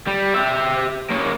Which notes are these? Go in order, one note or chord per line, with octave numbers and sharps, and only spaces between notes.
G3
G4 E5
A#3 C#4